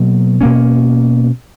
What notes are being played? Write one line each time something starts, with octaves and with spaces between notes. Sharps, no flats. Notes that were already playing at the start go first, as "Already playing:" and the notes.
Already playing: B2 F#3 A#3
B2 A#3 C#4